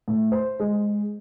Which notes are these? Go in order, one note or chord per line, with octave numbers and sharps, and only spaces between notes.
A2
C5
G#3